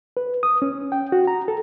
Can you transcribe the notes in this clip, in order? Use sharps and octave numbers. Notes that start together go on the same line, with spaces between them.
B4
D#6
C#4
G5
F#4
A#5
A4